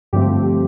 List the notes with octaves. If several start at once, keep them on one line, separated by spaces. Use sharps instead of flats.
G2 D3 F3 A3 C4 G4